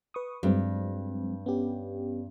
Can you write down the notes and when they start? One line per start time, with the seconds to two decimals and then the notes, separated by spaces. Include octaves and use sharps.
0.14 B4 C#6 D#6
0.43 G2 F#3 G#3 C4
1.46 B3 C#4 G4